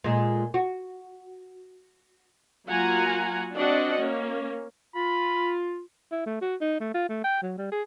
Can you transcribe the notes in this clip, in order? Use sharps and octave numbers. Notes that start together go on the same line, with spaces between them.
A#2 G#3
F#4
F#3 A#3 F4 F#5 G#5 A#5
C4 D4 F#4 D5 D#5 F#5
A#3 C#4
F4 B5
E4
A3
F#4
D#4
A3
F4
A3
G5
F#3
G3
G#4